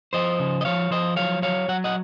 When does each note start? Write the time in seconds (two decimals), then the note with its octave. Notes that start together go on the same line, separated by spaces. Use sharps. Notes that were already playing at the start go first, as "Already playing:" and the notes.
0.13 F3 C5 D#5
0.39 C#3
0.61 D#5
0.65 F3 C#5 F5
0.91 F3 C5 D#5
1.16 F#3 C#5 F5
1.42 F#3 C#5 F5
1.69 F#3 F#5
1.84 D#5 F#5